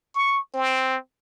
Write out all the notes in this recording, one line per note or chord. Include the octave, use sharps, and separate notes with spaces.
C#6
C4